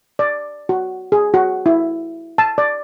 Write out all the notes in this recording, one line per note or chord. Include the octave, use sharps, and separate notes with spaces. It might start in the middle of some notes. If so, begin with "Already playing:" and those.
D5
F#4
G#4
F#4
E4
A5
D5